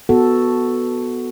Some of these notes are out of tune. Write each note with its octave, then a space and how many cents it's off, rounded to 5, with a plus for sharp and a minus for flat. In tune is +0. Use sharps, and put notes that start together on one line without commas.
B3 +0 F#4 +0 A4 +0